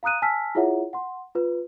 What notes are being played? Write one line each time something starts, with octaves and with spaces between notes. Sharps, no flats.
F5 A#5 D#6 F#6 D#7
G#5 A5 E6 F6 B6
E4 F4 G#4 C#5 E5 F#5
F#5 C6
F4 B4